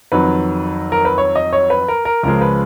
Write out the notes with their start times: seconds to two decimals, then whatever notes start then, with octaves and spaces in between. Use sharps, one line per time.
0.12 F2 D#3 F#3 B4
0.92 A#4
1.05 B4
1.18 C#5
1.36 D#5
1.53 C#5
1.70 B4
1.88 A#4
2.05 A#4
2.23 C#2 C#3 F3 G#3 A#4
2.41 B4